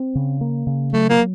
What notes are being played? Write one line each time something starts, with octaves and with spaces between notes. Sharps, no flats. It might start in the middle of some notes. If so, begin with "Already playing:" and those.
Already playing: C4
C#3
A#3
C#3
F#3 A3
A#3